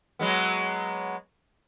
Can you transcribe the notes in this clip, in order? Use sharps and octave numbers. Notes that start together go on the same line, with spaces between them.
F#3 G#3 B3